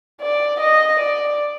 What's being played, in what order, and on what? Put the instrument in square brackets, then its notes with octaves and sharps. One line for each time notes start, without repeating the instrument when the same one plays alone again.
[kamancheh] D5
D#5
D5